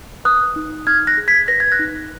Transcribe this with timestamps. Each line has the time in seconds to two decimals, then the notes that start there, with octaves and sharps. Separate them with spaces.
0.25 B4 D#6 F#6
0.56 D#4
0.87 D#4 F6 G#6
1.07 F#6 A#6
1.17 G#4
1.28 G#6 B6
1.48 B4 A#6
1.60 G#6
1.72 F#6 A#6
1.79 D#4